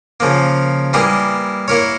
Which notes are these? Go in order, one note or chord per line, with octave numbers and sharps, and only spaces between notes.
C#3 F3 A#3
E3 G3 A#3 E4 G#4
A#3 E4 A#4 C#5